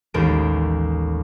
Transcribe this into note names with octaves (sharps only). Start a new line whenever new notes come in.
A1 D#2 G#3 A6 D7